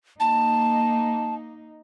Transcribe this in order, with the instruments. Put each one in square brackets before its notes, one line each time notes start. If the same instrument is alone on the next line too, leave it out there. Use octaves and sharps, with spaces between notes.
[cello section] A#3 D#4 [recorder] A5